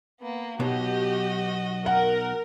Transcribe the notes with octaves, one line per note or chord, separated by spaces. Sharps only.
A#3 B3
B1 B2 F#3 F#4 G4 D#5
A#4 F#5